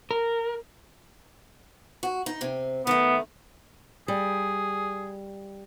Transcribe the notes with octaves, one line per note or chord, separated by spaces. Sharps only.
A#4
F#4
D#4
C3 C4
D#3 A3 B3
G3 G#4